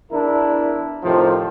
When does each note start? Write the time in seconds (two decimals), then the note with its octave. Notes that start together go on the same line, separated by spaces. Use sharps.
0.11 E2 D4 E4 A#4
1.03 F2 A2 C3 D#3 F3